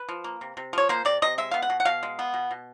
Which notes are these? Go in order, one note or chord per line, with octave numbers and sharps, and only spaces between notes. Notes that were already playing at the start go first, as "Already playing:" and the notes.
Already playing: B4
F3
A#3
C3
C3
F3 C#5
A#3 C5
C3 D5
C3 D#5
G#3 E5
B3 F5
F#5
B2
F#5
B2 F5
G#3
B3
B2
B2